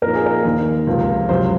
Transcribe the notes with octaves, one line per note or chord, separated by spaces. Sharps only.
A#2 F3 C4 D#4 A#4
G#4
A#4
D#2 D#3 A#3
C#2 C3 F3
C#2 C3 F#3 C5